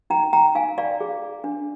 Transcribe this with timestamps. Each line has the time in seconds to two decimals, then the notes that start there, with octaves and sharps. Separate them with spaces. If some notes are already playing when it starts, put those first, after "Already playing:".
0.10 D#4 G5 A#5
0.33 G5 A#5
0.55 D#4 F5 G#5
0.78 D5 F5
1.01 G#4
1.44 D4